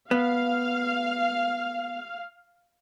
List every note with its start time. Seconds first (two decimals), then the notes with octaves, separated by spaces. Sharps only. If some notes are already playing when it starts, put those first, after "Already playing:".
0.11 B3 F5